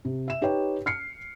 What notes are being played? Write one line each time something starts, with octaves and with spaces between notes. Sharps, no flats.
C3
E5 E7
D#4 G4 B4 C#5 G5
F6 C7 C#7